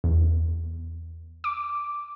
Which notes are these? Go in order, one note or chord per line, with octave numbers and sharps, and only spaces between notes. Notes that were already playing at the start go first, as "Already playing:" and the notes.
E2
D6